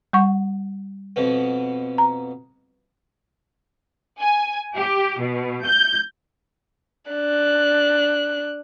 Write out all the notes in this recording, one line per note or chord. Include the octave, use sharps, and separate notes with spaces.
G3 F#5 C#6
F2 B2 B3
A#5
G#5
G4
B2
G6
D4 F#6